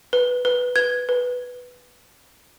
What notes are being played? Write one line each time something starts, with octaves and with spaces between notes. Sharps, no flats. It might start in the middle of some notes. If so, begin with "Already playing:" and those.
B4
B4
B4 G#6
B4